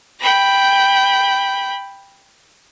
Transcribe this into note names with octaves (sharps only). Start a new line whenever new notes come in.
G5 B5